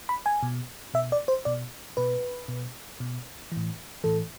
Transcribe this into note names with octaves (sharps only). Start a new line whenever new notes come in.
B5
G#5
B2
B2 E5
D5
C5
B2 D5
B2 B4
B2
B2
E3
A2
A2 E3 A4